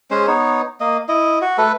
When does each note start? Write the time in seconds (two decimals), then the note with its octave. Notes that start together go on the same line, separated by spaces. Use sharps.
0.11 G#3 C#4 C5
0.27 B3 D#4 C#5
0.80 A#3 D#5
1.09 E4 D#5
1.41 F#4
1.58 A3 A4 B4